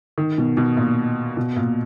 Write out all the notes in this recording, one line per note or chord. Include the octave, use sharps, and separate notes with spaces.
D#3
B2
B2
A#2
B2
A#2